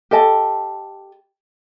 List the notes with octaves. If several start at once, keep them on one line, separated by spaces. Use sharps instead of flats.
G4 A4 D#5 A5